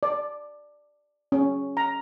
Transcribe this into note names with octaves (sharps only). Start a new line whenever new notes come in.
D5
C#4
A#5